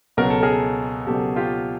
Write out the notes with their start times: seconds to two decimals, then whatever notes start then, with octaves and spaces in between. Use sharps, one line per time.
0.17 C#2 B2 F#3 A#4
0.30 A4
0.43 G#4 A#4
1.06 C#2 B2 F#3 G4 A4
1.36 F4 G4